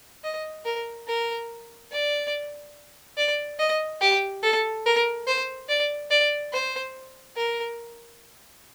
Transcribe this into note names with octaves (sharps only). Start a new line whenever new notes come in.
D#5
A#4
A#4
D5
D5
D#5
G4
A4
A#4
C5
D5
D5
C5
A#4